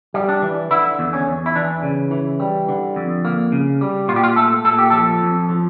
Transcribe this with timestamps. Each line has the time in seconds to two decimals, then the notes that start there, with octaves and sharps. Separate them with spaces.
0.14 G3
0.29 D4
0.42 E3
0.71 D3 E4
0.99 E2
1.13 C#4
1.27 E2
1.46 E4
1.55 E3 D4
1.83 C#3
2.11 E3
2.40 G3
2.69 D3
2.96 F2
3.25 A#3
3.52 C#3
3.81 G3
4.08 A#2 F4
4.16 G4
4.23 F4
4.36 A3 A4
4.65 A#2 A4
4.78 G4
4.90 F3 A4
5.22 F2
5.49 F3